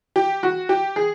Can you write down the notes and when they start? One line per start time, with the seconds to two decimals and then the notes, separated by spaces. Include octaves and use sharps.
0.16 G4
0.43 F#4
0.69 G4
0.96 G#4